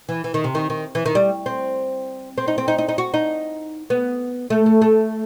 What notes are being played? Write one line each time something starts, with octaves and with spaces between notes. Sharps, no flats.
E3
E3
D#3
C3
D#3
D#3
E3
D#3
G3
C4
C4
D#4
C4
D#4
D#4
D#4
F#4
D#4
B3
A3
A3
A3